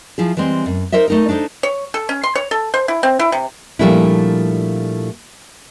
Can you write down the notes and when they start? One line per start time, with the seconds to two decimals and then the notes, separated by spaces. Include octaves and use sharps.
0.18 F3 E4 G#4
0.37 E3 G3 G#3 C4
0.66 F#2
0.92 D#4 A#4 C5 D#5 E5
1.08 A3 D#4 A#4
1.29 D4 D#4 A4 C5
1.63 C#5
1.94 A4
2.09 C#4
2.23 C6
2.35 C#5
2.51 A4
2.74 C5
2.88 E4
3.03 C4
3.19 E4
3.32 C3
3.79 A#2 F3 G3 A3 D4 E4